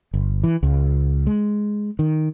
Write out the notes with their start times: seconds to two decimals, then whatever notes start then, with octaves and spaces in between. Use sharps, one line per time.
0.13 G1
0.43 E3
0.63 C#2
1.27 G#3
1.99 D#3